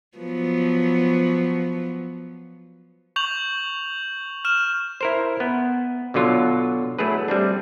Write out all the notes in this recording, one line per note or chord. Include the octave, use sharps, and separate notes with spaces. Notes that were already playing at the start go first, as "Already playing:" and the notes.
F3 F#3 B3
C#6 G6 F7 F#7
F6 E7
E4 A#4 C5
B3
B2 D3 F#3 F4
F#3 A3 E4 G#4 B4
G3 C4 D4